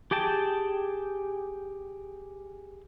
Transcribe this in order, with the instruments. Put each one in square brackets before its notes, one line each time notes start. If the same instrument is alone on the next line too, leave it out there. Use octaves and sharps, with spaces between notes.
[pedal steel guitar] G4 G#4 G5 A5